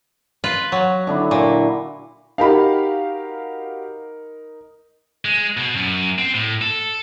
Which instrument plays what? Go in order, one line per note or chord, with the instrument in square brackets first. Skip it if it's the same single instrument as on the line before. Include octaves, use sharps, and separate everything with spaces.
[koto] F4 B4
F#3
[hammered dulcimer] D3 D4 E4
[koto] A#2 [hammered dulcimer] F#4
[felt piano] D#4 A#4 B5 [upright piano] F#4 G4 F5
[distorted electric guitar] G#3
B2
F#2
C4
A2
A4